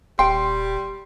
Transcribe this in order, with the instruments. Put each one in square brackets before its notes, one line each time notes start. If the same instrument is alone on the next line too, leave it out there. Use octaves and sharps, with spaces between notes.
[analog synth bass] D#1 [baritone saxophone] G3 [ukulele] G5 [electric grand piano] C6